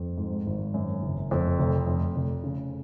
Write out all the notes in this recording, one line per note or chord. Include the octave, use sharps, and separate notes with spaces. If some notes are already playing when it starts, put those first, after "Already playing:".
Already playing: F2
G#2
G#1
F#2
F#1
F2
F1
F2
F1
C#3